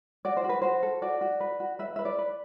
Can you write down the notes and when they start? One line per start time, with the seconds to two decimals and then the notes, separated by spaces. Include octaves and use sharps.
0.25 F#4 D5
0.37 C5
0.44 F#4
0.49 B4
0.62 F#4 C5
0.83 A4
1.02 F#4 D5
1.21 F#4
1.40 B4
1.60 F#4
1.79 B4 E5
1.96 B4 E5
2.05 D5
2.19 B4